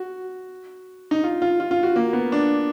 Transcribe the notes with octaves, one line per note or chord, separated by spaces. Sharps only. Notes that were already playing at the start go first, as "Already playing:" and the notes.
Already playing: F#4
D#4
F4
F4
F4
F4
F#4
A#3
B3
D4